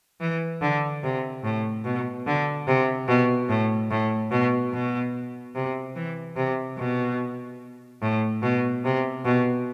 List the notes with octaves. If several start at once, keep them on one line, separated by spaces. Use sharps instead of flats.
E3
D3
C3
A2
B2
D3
C3
B2
A2
A2
B2
B2
C3
E3
C3
B2
A2
B2
C3
B2